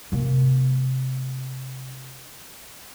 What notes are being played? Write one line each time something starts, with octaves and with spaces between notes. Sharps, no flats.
C3 A#3